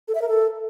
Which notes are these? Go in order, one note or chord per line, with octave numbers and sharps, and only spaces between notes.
A4
E5
A#4
A4